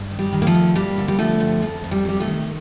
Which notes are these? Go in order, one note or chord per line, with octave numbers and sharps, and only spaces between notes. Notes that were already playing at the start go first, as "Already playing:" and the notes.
Already playing: G2
D#3
G3
D#3
A#3
F3 A3
G2
G2 G3 A#3
D3
G3
D3 F3 A3
G2
F2 F3
F2
G3
C3 G3
F3 A3
D#3